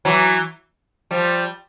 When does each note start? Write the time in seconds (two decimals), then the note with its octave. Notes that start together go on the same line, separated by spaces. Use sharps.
0.05 E3 F#3
1.11 F3 G3